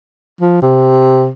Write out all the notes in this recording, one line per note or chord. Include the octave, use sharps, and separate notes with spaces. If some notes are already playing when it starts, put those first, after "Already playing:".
F3
C3